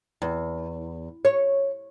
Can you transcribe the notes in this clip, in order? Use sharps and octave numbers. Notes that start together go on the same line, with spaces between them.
E2
C#5